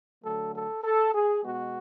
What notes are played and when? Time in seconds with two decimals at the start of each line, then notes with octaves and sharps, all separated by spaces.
0.23 D3 F#3 A3 A4
0.53 A4
0.84 A4
1.13 G#4
1.43 B2 G#3 B3 F#4